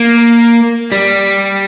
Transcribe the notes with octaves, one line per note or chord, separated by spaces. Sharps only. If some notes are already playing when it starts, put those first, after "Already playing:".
Already playing: A#3
G3